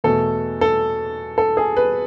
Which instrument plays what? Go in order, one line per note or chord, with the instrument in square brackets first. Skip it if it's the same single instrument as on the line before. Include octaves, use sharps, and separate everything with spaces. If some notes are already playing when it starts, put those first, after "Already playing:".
[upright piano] E2 B2 A3 A4
A4
A4
G#4
B4